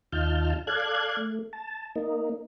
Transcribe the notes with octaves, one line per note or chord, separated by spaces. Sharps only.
D#2 D#4 F4 A5 F6 G6
A4 D5 F5 F#6 G#6
A3
A5
A#3 D#4